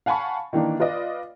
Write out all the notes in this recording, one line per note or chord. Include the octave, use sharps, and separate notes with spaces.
F5 F#5 G#5 A5 B5 C#6
D#3 E3 A#3 D4
F4 B4 D5 D#5